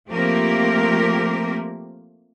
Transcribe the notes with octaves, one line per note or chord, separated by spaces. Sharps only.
F3 A3 A#3 C4 G4 A#4